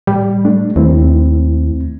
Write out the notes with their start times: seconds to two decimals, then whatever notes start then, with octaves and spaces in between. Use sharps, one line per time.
0.07 A2 G3
0.45 A3 D4
0.76 D#2 A3 C4 E4